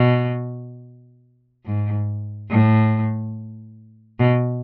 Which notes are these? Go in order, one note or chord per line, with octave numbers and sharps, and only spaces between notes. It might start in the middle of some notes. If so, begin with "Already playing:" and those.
Already playing: B2
G#2
A2
B2